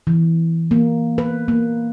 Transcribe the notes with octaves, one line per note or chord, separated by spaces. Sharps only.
E3
A#3
B4
A#3